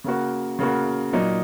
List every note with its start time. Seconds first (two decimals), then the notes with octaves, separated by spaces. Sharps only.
0.04 C#3 A#3 F#4
0.59 C#3 A#3 F#4
1.13 A#2 F#3 D#4